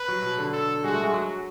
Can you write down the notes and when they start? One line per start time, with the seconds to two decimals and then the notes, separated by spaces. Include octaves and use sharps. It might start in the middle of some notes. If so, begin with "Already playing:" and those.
Already playing: B4
0.08 F#3
0.22 B2
0.38 D3
0.53 A4
0.84 G#3 F#4
0.94 A3
1.04 G#3
1.14 F#3 F#4